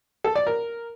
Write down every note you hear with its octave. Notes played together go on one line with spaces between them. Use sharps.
A4
D5
A#4